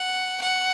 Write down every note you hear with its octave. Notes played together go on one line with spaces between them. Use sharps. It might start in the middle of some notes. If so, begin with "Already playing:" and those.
Already playing: F#5
F#5